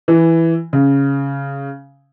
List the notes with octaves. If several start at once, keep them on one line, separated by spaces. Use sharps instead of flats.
E3
C#3